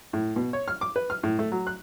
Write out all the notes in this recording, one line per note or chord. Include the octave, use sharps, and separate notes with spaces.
A2
B2
C#5
F6
D6
B4
F6
A2
A3
F#3
F#6